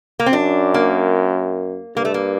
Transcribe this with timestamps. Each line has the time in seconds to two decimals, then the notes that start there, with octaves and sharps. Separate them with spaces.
0.19 A#3
0.26 C4
0.33 F#2 D4
0.74 A#3
1.96 G2 A#3
2.05 A3
2.14 A#3